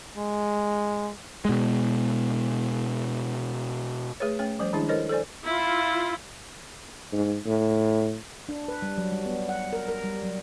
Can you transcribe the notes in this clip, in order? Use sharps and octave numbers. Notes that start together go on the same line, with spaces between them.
G#3
B2 G#3
A3 G#4 B4 C#5
A3 C#4 C#5 G5
F3 G3 C#4 C5
D#3 G#3 D4 E4 G#4
E4 A4 A#4 C5 C#5 D#5
A4 C5 D5 G#5
E4 F4
G#2
A2
D4
B4
G3
F#3
G3
B3
F#5
A#4
A#4
G3
F#3